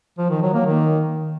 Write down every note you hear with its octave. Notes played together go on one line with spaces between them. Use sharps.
F3
D#3
F#3
A#3
D#3